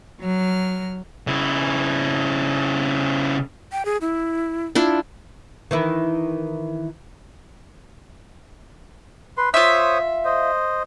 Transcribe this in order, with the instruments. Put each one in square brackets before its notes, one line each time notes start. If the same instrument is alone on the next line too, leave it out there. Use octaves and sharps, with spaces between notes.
[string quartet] F#3 F6
[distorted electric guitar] C#3 E4
[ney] G5
G#4
E4
[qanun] D4 E4 F4
[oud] D#3 E3 E4
[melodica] B4 C6
[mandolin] F4 E5 [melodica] C5 C#5 D#6
[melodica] C5 D#5